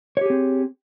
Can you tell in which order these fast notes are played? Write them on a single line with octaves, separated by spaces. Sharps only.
C#5 G4 G#4 C4